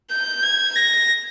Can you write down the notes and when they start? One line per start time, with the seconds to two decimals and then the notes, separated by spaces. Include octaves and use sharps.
0.11 G6
0.43 G#6
0.76 A#6